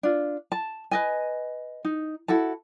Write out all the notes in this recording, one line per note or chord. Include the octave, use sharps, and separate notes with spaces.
D4 F4
A5
B4 D#5 G#5
D#4
E4 F#4 A4 A5